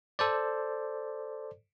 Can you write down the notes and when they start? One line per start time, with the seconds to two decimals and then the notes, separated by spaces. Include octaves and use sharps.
0.19 A4 C5 D5